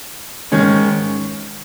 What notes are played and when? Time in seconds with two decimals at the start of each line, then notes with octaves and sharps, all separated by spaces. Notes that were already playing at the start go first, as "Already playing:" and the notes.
0.52 G#2 D#3 G#3 C#4